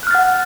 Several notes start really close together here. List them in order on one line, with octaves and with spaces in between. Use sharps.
F#6 F6 A6 F#5